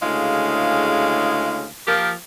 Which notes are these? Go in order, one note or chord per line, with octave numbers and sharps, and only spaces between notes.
D2 C#3 G#3 E4 F5
F3 A#3 G4 A#4